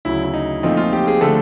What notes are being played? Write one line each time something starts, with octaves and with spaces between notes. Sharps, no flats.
D2 C#3 F#3 E4
E4
D#4
A#2 F3 A3 C4 D#4
F4
G4
G#4
D3 F3 A3 A4